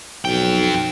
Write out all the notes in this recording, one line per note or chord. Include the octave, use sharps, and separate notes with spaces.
B1 F2 G5